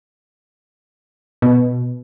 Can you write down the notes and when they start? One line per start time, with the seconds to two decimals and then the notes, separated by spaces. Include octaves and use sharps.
1.42 B2